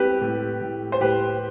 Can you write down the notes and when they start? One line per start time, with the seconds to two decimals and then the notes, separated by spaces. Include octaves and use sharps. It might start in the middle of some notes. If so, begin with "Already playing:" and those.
Already playing: C4 G4 B4
0.21 A2
0.62 A2
0.92 C5
1.01 A2 G4 B4